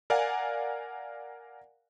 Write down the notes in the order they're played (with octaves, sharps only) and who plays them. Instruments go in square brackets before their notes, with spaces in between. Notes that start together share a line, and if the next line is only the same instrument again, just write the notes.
[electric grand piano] A#4 D5 F5 F#5 G#5